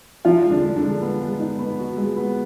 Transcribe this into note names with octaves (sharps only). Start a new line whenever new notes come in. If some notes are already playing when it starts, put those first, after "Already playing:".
F3 D#4 F4
G#3
D3 D4
G#3
D3 D4
G#3
B3
G#3
D#4
B3
F#4
G#3
B3